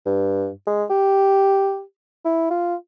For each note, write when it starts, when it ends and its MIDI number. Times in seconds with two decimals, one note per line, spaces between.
0.06 0.50 43
0.67 0.84 56
0.90 1.82 67
2.25 2.50 64
2.50 2.75 65